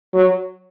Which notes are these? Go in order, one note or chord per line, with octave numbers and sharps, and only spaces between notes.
F#3